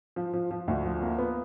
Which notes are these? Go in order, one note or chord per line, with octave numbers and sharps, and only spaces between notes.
F3
F3
F3
D2
F3
A#3
B3